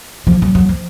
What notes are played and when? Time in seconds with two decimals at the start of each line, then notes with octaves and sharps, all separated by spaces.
0.27 F3
0.42 F#3
0.55 F#3
0.69 F3